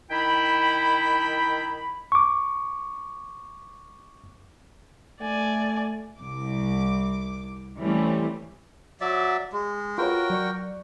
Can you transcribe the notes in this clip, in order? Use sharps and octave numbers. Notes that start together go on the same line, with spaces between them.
D#3 E4 G5 B5
C#6 D6
A3 D5 G#5
C2 D6
E3 G3 A3 C4 C#4
F#3 D5 E5
G#3
F4 F#4 A#4 B4 C#5 G5
F#3 D5 C#6